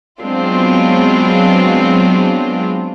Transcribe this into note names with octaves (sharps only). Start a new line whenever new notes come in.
F#3 G#3 B3 C4 D4 F4